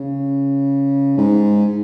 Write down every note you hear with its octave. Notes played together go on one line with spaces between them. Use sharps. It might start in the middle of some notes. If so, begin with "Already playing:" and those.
Already playing: C#3
G#2